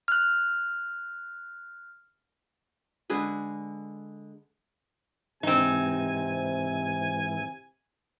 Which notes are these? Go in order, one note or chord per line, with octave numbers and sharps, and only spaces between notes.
F6 F#6
D3 G#3 G#4 B4
G#2 C3 E3 C4 D#4 G#5